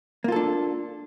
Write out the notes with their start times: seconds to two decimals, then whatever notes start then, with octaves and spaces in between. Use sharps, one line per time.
0.24 A#3
0.28 F4
0.32 A4
0.36 D4